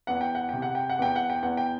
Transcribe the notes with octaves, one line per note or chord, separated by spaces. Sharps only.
E2 F#5
G5
F#5
C3 G5
F#5
G5
F#5
E2 G5
F#5
G5
E2 F#5
G5